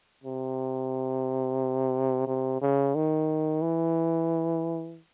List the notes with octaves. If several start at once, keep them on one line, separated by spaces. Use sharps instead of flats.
C3
C3
C#3
D#3
E3